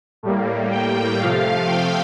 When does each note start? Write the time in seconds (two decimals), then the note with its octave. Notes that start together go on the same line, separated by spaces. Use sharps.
0.23 A2 G3 A#3
0.72 G5
1.20 C3 F3 A3 F5
1.67 G5